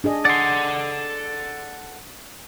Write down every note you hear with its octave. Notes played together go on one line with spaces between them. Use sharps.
D4 G#4 D#5
A4 D5 F#5 C6